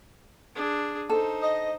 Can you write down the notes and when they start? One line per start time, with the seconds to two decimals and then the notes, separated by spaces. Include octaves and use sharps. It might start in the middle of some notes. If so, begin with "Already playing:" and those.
0.55 D4 G#4
1.10 D#4 A4 C5
1.42 D#5